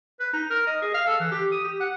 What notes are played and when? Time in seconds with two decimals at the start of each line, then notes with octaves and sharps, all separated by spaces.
0.20 B4
0.33 D#4
0.50 A#4
0.67 D#5
0.82 G#4
0.94 F5
1.06 A4
1.20 E3
1.32 G4
1.52 D#6
1.64 G4
1.80 F#5